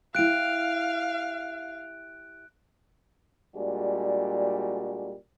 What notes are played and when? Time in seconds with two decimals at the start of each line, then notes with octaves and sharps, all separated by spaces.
0.15 E4 G4 F5 F#6 D7
3.55 A#2 G3 G#3 D4 F#4